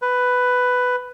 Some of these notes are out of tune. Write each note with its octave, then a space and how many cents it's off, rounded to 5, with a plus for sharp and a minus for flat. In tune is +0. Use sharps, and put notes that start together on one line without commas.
B4 +10